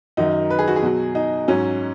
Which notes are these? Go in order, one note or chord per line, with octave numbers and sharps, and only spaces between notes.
F#2 D#3 F#3 D#4
B4
G#4
F#4
G#4
B2 F#3
D#4
G#2 F#3 C#4